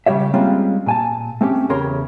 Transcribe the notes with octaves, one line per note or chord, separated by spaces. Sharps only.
C#3 G3 G4 C#5 E5
G3 G#3 A#3 C4 C#4 F4
A#2 G#5 A5
A3 C4 C#4 G4
E2 C#3 G4 A#4 C#5 C6